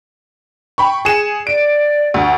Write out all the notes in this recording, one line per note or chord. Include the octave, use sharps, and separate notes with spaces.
G5 B5 C#6
G#4 C#7 E7
D5 D7
D2